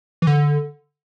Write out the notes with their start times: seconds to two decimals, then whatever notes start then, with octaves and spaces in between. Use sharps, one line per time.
0.22 E3
0.27 D3